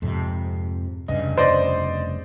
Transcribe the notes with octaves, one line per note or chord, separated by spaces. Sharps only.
F2 G#2 C3
F1 G2 C#3 D#5
C5 D5 D#5